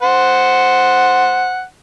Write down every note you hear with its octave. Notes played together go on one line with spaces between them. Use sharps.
C5 F#5